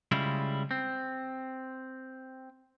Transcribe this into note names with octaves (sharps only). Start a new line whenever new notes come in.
C#3 G3 G#3 E4 F4
C4